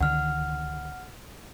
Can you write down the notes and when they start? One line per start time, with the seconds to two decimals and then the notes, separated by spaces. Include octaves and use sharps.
0.01 C#2 D3 D#3 F#5 F6